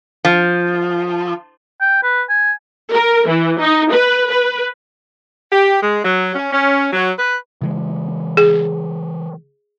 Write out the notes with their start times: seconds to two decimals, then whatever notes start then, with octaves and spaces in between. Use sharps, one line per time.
0.25 F3
1.81 G5
2.03 B4
2.29 G#5
2.92 A#4
3.26 E3
3.60 D#4
3.92 B4
4.29 B4
5.52 G4
5.82 G#3
6.04 F#3
6.35 C#4
6.52 C#4
6.93 F#3
7.19 B4
7.62 C#3 E3 G#3
8.37 G#4